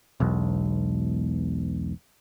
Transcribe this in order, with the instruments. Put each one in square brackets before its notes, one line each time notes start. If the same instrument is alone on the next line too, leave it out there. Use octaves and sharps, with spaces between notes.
[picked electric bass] E1 B1